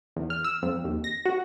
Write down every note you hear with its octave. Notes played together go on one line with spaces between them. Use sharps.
E2
F6
E6
F2
D#2
A#6
F#4